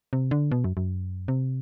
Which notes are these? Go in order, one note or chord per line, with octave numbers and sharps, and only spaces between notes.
C3
D3
B2
F#2
F#2
C3